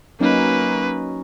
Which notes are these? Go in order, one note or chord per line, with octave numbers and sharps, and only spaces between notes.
F#3 A#3 C#4 D#4 B4